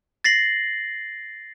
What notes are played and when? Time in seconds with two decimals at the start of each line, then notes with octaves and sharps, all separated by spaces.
0.24 A6 A#6 C7 F#7